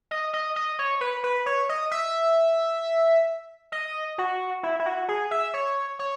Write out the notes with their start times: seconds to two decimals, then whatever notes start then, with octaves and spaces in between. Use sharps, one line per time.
0.11 D#5
0.33 D#5
0.56 D#5
0.79 C#5
1.01 B4
1.24 B4
1.46 C#5
1.69 D#5
1.91 E5
3.72 D#5
4.18 F#4
4.63 E4
4.79 E4
4.86 F#4
5.08 G#4
5.31 E5
5.54 C#5
5.99 C#5